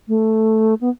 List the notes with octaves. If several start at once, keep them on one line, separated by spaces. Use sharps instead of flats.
A3
B3